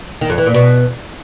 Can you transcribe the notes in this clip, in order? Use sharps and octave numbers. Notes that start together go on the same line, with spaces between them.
D#3
F2
E3
A#2
B2